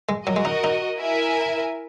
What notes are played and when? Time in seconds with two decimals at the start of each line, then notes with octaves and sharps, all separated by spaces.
0.09 G#3
0.27 F#3 F#4 A#4 D#5
0.36 G#3
0.45 D#4
0.64 D#4
1.00 E4 A#4 E5 G#5